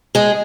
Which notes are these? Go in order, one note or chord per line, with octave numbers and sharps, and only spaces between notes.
G#3 G#4